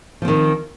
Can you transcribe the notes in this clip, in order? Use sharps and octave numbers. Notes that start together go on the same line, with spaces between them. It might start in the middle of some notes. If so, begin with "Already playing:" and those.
D#3 F3 C4